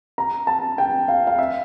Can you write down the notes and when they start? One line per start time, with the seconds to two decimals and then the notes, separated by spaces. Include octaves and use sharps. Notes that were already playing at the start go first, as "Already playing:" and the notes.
0.18 A#5
0.47 A5
0.78 G5
1.08 F5
1.27 F5
1.38 E5